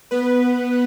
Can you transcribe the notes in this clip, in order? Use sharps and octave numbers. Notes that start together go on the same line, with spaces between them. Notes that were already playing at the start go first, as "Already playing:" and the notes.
B3 B4